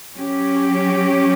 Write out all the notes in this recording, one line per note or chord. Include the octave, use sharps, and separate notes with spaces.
F#3 C#4 G4